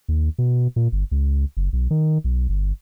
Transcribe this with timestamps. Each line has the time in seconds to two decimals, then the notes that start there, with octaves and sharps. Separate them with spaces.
0.09 D#2
0.38 B2
0.76 A#2
0.92 G1
1.11 C#2
1.57 F#1
1.73 B1
1.91 D#3
2.24 B1
2.49 G1